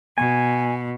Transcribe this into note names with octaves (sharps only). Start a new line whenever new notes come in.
B2 G#5